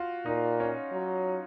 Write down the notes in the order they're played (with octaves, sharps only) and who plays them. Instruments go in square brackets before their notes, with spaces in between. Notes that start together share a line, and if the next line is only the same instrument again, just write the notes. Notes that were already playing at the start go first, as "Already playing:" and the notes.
Already playing: [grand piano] F4 F#4
[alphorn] A#2 [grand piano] D#4
[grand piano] C#4
[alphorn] F#3